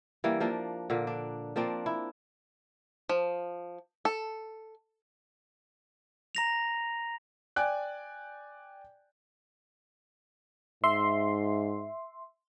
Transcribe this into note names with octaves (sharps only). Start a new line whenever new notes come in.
E3 G3 A#3
F3 A#3 D4
A#2 D3 A#3
D4
F3 A#3 C4 D4
E4
F3
A4
A#5 A#6 F7
D5 G5 G#5 F#6
G#2 E5 C6